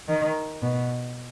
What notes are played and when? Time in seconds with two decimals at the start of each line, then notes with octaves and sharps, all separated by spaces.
0.08 D#3
0.62 B2